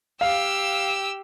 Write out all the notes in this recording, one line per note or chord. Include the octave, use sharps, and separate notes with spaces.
G4 F5 E6